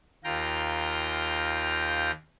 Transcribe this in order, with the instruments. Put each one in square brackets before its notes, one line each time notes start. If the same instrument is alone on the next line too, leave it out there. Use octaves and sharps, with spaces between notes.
[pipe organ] D#2 F4 G5 A#5 G6